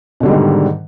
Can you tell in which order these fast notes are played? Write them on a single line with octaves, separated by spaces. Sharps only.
B2 D3 G3 G#2 D#3